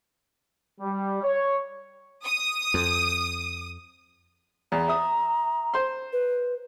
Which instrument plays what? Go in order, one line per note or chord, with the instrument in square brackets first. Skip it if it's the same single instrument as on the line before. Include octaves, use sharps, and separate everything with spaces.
[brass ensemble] G3
C#5
[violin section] D#6
[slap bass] F2
[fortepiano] E2 [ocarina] A#5
[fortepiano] E5 D#6
C5 C6
[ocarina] B4